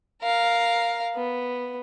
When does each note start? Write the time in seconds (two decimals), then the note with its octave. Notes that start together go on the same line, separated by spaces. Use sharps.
0.22 A#4 F5
1.15 B3